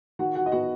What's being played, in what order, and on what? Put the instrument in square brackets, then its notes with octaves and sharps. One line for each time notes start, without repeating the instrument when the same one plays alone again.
[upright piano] D#3 F#4 F#5
F#4 F#5
D#5
B3 F#4 F#5